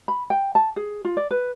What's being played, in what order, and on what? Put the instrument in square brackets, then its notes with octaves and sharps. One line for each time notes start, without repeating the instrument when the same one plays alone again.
[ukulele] B5
G5
A5
G#4
F4
D5
B4